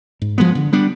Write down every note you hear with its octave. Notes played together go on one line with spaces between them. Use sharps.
G#2
F3 G#3 B3
D3
G3 B3 D4